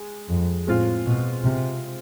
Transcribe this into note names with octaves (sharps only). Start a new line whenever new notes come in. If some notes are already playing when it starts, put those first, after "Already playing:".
Already playing: G#3
F2
A2 G#3 C4 F4
B2
C3